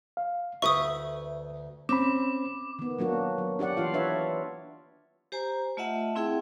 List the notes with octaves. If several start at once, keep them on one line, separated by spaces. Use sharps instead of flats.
F5
D2 B4 E5 C#6 D#6
C4 C#4 B5 D6
D#3 B3
F#3 A#3 D4 F#4
F#3
D4 G4 D5 F#5
E3 F4 F5
D4 B4 C#5 E5
G4 C5 G#5 A#5
A3 F4 D#5 E5 F#5 A5
C4 E4 G#4 E5 G5